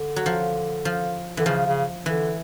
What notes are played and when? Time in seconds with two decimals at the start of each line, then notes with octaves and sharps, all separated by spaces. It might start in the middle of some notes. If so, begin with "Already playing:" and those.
Already playing: D3
0.16 F#3
0.26 F3
0.85 F3
1.37 D3 E3
1.46 C#3 F3
1.67 C#3
2.06 D3 E3